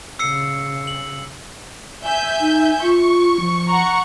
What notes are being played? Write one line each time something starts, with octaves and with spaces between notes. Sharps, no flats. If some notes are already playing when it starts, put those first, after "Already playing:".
C#3 E6 C7 C#7
F#7
E5 G#5 G6
D#4
F4 C#6
F3
F#5 A#5 C#6